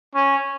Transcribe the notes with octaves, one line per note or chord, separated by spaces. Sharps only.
C#4